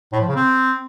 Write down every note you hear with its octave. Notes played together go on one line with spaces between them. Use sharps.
A2
F3
C#3
C4